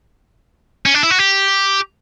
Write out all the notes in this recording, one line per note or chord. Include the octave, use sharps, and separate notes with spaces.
C#4
D4
E4
F#4
G4